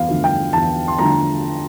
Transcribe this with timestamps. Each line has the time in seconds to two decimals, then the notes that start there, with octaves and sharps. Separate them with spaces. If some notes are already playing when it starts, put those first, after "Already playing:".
Already playing: E2 F5
0.09 D3 F3 A3
0.24 G5
0.53 E2 A5
0.88 C6
0.99 D3 F3 A3 A#5